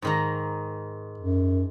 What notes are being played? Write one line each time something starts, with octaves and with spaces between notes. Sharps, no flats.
G#2 D#3 A#5
F#2